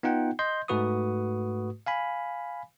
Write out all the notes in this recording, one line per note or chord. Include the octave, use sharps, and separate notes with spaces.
B3 D#4 F4 F#5 G5
D#5 C6 G6
G#2 A3 F#4 B4 C#6 D#6
F5 G#5 B5